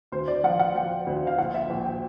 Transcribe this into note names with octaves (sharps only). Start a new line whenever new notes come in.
D2 C5
D5
F3 F#5
F#5
F3 G5
D2
F5
A#1 F#5
E5
A#1
G5